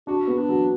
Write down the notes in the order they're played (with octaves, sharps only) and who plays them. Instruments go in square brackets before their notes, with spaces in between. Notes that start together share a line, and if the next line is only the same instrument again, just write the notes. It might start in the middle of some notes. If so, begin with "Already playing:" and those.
[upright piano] D4 [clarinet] F#4
[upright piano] B3
[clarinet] D4
[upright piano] F#3